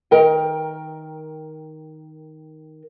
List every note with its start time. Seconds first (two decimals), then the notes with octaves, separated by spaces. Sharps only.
0.11 D#3 A#4 G5